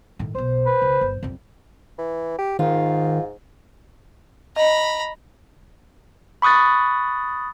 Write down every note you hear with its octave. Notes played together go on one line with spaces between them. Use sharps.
A2 D#3
B1 B2 C5
B4
C#2
G1
F2 G3
E3
G4
G#2 D#3 F4
D#5 A#5 B5
B5 C#6 D#6 F#6 A6